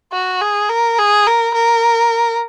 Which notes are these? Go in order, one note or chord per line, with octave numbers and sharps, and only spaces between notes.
F#4
G#4
A#4
G#4
A#4
A#4